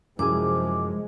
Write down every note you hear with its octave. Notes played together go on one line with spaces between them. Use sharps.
F#2 C3 F3 G#3 E4 G#4 D6